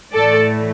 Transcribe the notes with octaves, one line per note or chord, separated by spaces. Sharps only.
A2 E3 A3 A4 D5